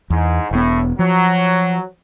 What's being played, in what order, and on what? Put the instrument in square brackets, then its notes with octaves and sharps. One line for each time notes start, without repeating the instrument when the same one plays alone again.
[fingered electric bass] E2 [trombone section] G#2
[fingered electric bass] E1 B3 [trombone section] A2
[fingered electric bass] F3 [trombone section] F#3